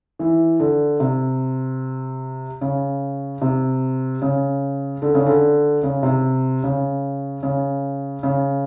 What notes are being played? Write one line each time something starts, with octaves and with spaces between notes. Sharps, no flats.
E3
D3
C3
C#3
C3
C#3
D3
C#3
D3
C#3
C3
C#3
C#3
C#3